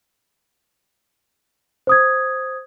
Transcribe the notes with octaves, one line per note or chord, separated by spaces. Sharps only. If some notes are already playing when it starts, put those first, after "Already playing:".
C5 D#6 G#6